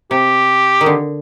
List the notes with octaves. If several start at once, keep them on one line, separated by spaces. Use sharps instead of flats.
C3 G4
D#3
D3